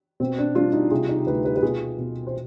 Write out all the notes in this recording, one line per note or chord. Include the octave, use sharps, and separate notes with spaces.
B2 C4
D4
G3 D4 F4
D#4 G4
C3 F4 G#4
D#4 G4
D2 G4 B4
G4 B4
B4
B2 F4 G#4
B2
C5